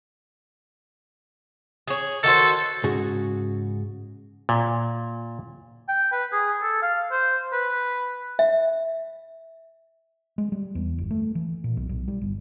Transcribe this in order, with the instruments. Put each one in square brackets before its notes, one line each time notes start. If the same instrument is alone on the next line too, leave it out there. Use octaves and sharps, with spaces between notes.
[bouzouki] G#4 C#5
[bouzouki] D#3 F#4 C5 [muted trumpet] A4
[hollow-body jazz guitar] G#2 C#3 F#4 G#4
[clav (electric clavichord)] A#2
[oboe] G5
B4
G#4
A4
F5
C5
B4
[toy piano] E5
[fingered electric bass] G#3
G3
E2
G1
A3
E3
A#2
B1
B1
G3
G1